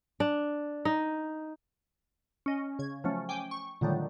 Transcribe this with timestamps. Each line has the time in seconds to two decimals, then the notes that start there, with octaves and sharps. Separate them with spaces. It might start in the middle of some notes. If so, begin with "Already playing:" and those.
0.20 D4
0.85 D#4
2.46 C#4 D#5
2.79 C#3 G#6
3.04 F3 F#3 A3 C#4
3.29 G5 G#5 D6
3.51 C#6
3.81 A#2 D3 D#3 F#3 G3 A3